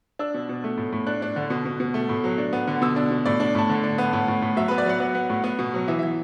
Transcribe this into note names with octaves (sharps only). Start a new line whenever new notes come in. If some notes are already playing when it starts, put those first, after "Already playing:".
D4 E6
B2
B2
A3
A2
A2
D4 F#6
D4
D3
B2
B2
B2
A3
A2
F#3
D4
B3
D3
B2 E6
D4
B2
A2 D5
D4
A2 A5
D3
D4
B3
A2
A2
A2
F#3 E5
B3 B4
D5
F#3 F#5
B3
B3
A2
B3
B2
F#3
E3 E5
E3 E5